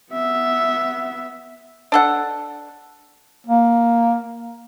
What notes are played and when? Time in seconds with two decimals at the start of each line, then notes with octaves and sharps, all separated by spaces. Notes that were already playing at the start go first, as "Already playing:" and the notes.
0.12 B3 E5
1.92 D4 A4 F#5
3.47 A#3